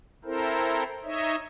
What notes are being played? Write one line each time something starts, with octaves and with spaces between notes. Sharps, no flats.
C4 E4 A4 A#4 C5
D#4 C#5 D#5 E5